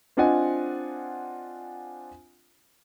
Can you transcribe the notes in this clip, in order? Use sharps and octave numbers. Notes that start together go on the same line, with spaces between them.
C4 D4 F4 D#5 F#5 G#5